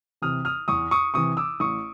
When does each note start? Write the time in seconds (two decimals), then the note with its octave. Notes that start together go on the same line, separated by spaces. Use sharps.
0.22 C3 E3 D#6 F6
0.45 D#6 F6
0.68 E2 C#6 D#6
0.91 C#6 D#6
1.14 C3 E3 C#6 D#6
1.37 D6 E6
1.60 A1 C#6 D#6